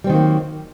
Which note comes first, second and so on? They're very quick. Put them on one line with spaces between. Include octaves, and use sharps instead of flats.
G3 C4 D#3 F#3 A#3